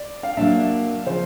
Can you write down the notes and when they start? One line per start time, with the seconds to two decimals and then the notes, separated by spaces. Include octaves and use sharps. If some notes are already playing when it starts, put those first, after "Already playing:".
Already playing: D5
0.23 F5
0.37 F#3 A#3 D4 E5
1.06 C#3 F3 C5